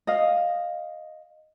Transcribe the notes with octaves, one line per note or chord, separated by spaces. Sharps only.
D#5 F5